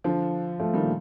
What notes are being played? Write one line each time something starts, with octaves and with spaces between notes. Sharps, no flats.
D3 F3
F3 A3
D#3 G3
A#2